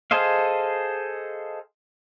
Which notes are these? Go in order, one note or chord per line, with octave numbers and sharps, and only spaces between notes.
G#4 A4 C5 D#5 F5